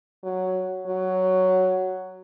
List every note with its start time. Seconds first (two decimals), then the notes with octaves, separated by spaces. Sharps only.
0.24 F#3
0.87 F#3